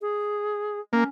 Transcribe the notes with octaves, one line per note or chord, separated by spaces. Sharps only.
G#4
A#3 C#4